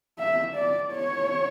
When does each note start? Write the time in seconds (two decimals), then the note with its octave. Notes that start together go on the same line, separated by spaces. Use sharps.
0.19 E5
0.55 D5
0.92 C#5